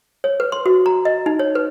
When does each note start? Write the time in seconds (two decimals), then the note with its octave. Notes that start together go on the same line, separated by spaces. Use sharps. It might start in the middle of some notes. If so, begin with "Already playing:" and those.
0.24 C#5
0.40 B4
0.52 C6
0.66 F#4
0.86 A#5
1.05 D#5
1.26 D#4
1.39 C#5
1.55 B4